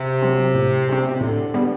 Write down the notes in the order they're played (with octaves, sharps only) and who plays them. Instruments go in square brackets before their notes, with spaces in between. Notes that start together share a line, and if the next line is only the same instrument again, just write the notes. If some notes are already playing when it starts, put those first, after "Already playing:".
Already playing: [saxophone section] C3
[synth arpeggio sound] F#3 C4
A2
G3 C4
[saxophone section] B2
C3
[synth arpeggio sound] A2 [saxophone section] D3
[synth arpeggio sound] G3 B3